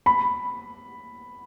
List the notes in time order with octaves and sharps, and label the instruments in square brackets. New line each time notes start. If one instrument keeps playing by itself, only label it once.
[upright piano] B5